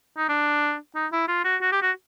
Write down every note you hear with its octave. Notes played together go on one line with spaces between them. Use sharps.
D#4
D4
D#4
E4
F4
F#4
F#4
G4
F#4